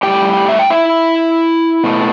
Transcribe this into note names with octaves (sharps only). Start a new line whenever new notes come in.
A2 G3 G4 G5
E5
G5
E4 E5
B2 A3